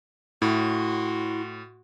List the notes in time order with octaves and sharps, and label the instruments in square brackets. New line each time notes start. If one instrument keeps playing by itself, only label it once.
[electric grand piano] A2 [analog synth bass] E4 [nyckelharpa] F#4 C6